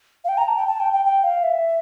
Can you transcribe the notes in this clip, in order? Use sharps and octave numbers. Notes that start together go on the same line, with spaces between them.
F5
G5
A#5
A5
G5
A5
G5
G5
G5
F5
E5